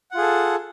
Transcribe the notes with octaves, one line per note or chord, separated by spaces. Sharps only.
F4 G#4 A4 F#5